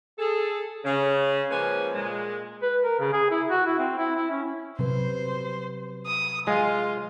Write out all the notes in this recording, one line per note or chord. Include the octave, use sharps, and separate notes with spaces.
G#4 A4
C#3
F3 G#3 A#3 C#4 B4 G#5
A#2 G#3
B4
A#4
C#3
G#4
E4
F#4
E4
C4
E4
E4
C#4
C3 F#3 B4 C5
D#6
G#3 F4